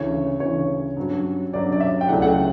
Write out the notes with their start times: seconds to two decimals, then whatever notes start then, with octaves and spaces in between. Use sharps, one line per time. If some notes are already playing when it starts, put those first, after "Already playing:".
Already playing: D2 C#3 E3 C#5
0.40 D2 C#3 E3 C#5
0.96 G2 F#3 C#4 F#4
1.53 G2 F#3 C#4 F#4 D5
1.72 D5
1.80 E5
2.01 G5
2.08 C#2 C#3 F#3 A3 E4 F#5
2.22 F#5
2.28 G5